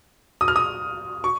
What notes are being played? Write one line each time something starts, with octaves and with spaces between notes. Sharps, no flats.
D#6
F6
D#6
C#6